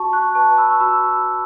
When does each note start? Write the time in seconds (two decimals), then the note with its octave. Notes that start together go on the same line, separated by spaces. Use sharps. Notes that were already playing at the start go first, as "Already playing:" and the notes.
Already playing: F#4 A5 C#6
0.13 C#6 F#6
0.35 B4 A5 C#6
0.58 B5 E6
0.70 C#6
0.80 F#4 B5 E6